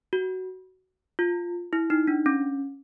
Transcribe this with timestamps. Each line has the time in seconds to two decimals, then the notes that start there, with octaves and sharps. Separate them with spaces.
0.13 F#4
1.19 F4
1.73 E4
1.90 D#4
2.07 D4
2.26 C#4